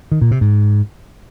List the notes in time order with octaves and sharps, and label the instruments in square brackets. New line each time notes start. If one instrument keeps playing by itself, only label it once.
[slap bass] D#3
A#2
C3
G#2